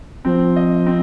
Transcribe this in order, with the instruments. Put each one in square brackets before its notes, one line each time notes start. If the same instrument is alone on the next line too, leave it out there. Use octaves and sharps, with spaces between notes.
[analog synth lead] F3 [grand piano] C4
[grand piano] D#5
C4